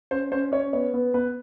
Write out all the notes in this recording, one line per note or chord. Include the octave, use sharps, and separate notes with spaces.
C#4 C5
C#4 C5
C#4 C#5
B3 C#5
B3
B3 B4